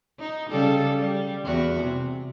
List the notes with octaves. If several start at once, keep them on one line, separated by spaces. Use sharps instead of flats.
D#4
C#3 G3 A4
G3
E2 F#4
C3